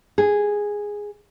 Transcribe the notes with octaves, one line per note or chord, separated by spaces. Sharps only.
G#4